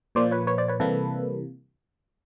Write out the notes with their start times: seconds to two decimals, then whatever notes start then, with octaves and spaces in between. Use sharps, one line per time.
0.15 A#2 F3 A#3 C5 D5
0.31 B4 C#5
0.47 B4 C#5
0.58 C5 D5
0.68 B4 C#5
0.80 C3 E3 G3 A#3 A4 B4